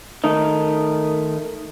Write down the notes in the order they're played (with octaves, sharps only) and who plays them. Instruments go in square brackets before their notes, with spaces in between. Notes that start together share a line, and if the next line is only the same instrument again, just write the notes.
[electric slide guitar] D#3 A3 D#4